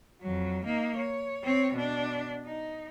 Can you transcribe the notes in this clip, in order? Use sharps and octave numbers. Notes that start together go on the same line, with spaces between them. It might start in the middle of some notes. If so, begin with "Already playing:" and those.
F2 F#3
A#3 D#4
C#5
C4 C#5
B2 D4
D#4